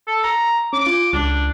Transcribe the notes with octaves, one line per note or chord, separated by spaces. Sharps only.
A4
A#5
C#4 D6
F4
C#2 D4